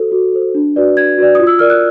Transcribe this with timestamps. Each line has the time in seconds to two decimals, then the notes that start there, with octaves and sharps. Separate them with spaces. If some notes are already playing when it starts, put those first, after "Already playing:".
Already playing: F#4 A4 C5
0.12 F#4
0.33 A4 C5
0.54 D4
0.76 F#4 B4 D5
0.96 D4 G#6
1.18 F#4 B4 D5
1.35 F4 D#6
1.47 E6
1.59 A#4 D5 F6
1.70 F#6